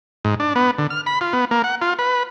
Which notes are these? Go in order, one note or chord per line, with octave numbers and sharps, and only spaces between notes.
G#2
D4
B3
D3
F6
B5
F4
B3
A#3
F#5
F4
B4